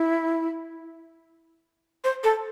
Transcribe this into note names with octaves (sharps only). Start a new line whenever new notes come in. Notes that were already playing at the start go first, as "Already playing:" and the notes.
Already playing: E4
C5
A4